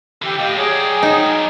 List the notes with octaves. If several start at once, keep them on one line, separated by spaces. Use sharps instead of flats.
D3 E3 G4
A2 G4 D#5 F5
F#3 G#4 C#5 D5 G5
D#4 D#5